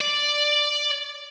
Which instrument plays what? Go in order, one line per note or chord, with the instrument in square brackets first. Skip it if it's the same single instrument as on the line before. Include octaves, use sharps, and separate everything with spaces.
[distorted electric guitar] D5